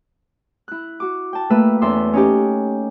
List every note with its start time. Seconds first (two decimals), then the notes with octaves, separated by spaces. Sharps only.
0.68 E4 F#6
1.00 F#4 D6
1.33 G5 A5
1.50 A3 A#3 B4 E5
1.82 E2 C#4 A4 E5 C6 D6
2.13 C#4 D#4 G4